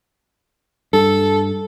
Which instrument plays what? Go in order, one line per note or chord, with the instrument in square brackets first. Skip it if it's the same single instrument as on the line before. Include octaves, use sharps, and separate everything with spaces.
[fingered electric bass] G2 [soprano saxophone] A4